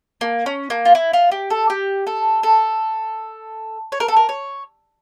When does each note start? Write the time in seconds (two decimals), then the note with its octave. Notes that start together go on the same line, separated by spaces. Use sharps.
0.21 A#3
0.46 C#4
0.70 A#3
0.85 F4
0.95 E4
1.13 F4
1.32 G4
1.50 A4
1.70 G4
2.07 A4
2.43 A4
3.92 C#5
4.00 A#4
4.08 A4
4.16 A#4
4.29 C#5